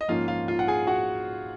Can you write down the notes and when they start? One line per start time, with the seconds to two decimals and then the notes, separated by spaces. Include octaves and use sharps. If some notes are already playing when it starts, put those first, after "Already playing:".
0.01 D#5
0.08 G#2 F3 A#3 C#4 F4 F5
0.28 F4 F5
0.48 F4 F5
0.59 F#5
0.68 G#4 G#5
0.87 F#4 F#5